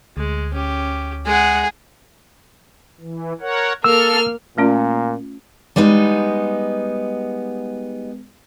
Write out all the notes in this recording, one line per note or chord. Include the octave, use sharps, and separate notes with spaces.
D2 G#3
C#4 G4
G#3 G#4 F#5
E3
A#4 C#5 F#5
A#3 A4 E6 F6
A#2 A3 C#4 F4
G3 G#3 B3 D#4